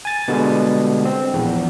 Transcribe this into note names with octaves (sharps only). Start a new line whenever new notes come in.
G#5 A6
B2 D3 G3 G#3
C4
A#1 E2